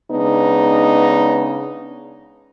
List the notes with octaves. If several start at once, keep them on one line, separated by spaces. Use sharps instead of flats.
C#3 G#3 B3 D4 D#4